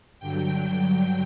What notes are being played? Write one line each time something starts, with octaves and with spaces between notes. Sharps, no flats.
G2 D3 F#3 G5